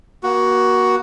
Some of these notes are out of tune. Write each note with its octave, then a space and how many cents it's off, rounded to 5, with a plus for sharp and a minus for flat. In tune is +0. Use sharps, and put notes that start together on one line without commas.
A#3 +35 F#4 +10